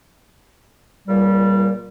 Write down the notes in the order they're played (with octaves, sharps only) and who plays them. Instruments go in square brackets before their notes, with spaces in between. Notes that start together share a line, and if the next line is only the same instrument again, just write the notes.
[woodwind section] C#2 A#2 G3